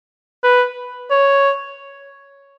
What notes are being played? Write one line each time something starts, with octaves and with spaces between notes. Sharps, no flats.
B4
C#5